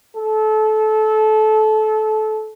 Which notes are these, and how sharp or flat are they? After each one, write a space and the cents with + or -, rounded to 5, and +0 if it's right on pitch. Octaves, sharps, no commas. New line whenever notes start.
A4 -25